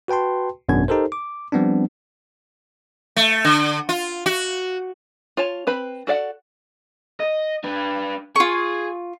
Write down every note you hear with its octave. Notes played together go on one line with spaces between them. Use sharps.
F#4 B4 G5 A5 C6
G#1 F#2 B2 B3 D4 G#6
D#4 G4 A4 A#4 C5
D6
F3 G3 B3 C4 D4
A3
D3
F4
F#4
F4 C#5 A5
C4 B4 B5
F#4 A4 D5 F5 F#5
D#5
D4 B4
F4 G#4 C#6